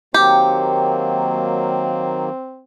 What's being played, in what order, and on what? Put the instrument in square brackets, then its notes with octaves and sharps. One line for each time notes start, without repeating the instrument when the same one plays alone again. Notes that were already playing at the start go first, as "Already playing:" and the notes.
[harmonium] D#3 F#3 A#3 [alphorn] C4 [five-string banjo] G4 [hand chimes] G5